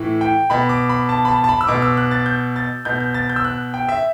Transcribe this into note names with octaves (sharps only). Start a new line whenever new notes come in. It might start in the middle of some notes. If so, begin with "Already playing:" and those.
Already playing: A2 E3
G5
B2 B5
D6
B5
A5
B5
A5
A5
B5
E6
B2 D6
E6
F#6
A6
G6
A6
B2 G6
G6
A6
G6
E6
F#6
G5
E5